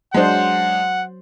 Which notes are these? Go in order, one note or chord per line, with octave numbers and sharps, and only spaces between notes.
F#3 G#3 D4 C5 F#5